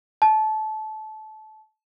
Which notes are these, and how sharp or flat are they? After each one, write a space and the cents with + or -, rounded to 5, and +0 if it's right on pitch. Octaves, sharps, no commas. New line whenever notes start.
A5 -20